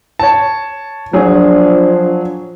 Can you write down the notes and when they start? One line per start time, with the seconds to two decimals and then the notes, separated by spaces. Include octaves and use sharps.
0.19 C#5 A5
1.13 F3 F#3 D4 G#4